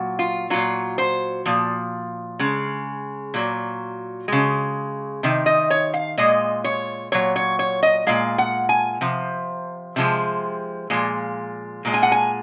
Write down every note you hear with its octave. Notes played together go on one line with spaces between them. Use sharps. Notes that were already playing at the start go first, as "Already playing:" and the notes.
Already playing: A#2 F#3
F4
A#2 F#3 F4
C5
A#2 F3
C#3 G#3
A#2 F#3
C#3 G#3
C3 D#3
D#5
C#5
F5
A#2 G#3 D#5
C#5
A#2 F#3 C#5
C#5
C#5
D#5
A#2 G#3 F5
F#5
G#5
C3 F3
C3 F3 G#3
A#2 F3 G#3
A#2 G#3
G#5
F#5
G#5